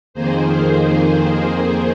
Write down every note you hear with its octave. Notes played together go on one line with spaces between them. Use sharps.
F2 D#3 A#3 G#4 C5